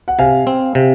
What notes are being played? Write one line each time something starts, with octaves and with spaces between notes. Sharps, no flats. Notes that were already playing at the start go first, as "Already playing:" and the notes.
F#5
C3 F5 G#5
C4
C3